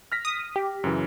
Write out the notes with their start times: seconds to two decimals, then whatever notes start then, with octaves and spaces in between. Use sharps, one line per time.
0.12 F6 A#6 B6
0.25 D#6
0.56 G4
0.84 F#2 C#3 E3